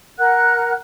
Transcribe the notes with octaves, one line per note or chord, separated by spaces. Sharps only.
A#4 F#5 F#6